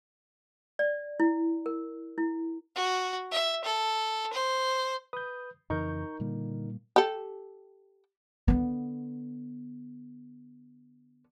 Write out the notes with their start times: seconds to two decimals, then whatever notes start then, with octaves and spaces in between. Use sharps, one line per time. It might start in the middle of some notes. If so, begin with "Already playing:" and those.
0.79 D5
1.20 E4
1.66 A#4
2.18 E4
2.76 F#4
3.32 E5
3.64 A4
4.33 C5
5.13 B4 D#6 G6
5.70 F2 C#3 E3 D#4 A#4 A#5 C#6 G6
6.20 A#2 D3 G3 A#3
6.96 G4 A4
8.48 D3 B3